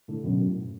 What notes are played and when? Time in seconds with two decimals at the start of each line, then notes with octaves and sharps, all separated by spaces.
0.08 A2 D3
0.24 F#2 B2
0.38 F#2
0.45 A2